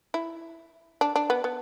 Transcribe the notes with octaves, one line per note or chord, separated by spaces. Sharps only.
E4
D4
D4
B3
B3